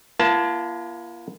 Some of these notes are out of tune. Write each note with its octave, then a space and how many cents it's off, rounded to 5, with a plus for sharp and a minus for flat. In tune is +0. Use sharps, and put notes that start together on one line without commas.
A#3 +35 F4 -40 A5 +0